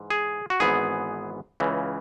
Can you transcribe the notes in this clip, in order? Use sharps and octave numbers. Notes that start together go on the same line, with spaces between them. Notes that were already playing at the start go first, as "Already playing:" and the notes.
Already playing: G#2 E3
G#4
F#4
G#1 G#2 E3 B3 G#4
C#2 C#3 E3